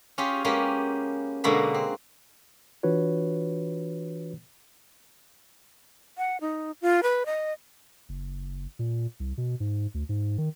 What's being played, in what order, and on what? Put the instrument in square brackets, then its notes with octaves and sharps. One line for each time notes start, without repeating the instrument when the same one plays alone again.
[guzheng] C#4 F4 G4 G#4
G#3 A#3 B3 C#4 G4
B2 D3 G#3 A#3 F#4 B5
C4
[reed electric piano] E3 D4 F4 F#4 B4 C#5
[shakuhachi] F#5
D#4
F4
B4
D#5
[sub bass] F#1
A#2
C2
B2
G#2
D2
G#2
D#3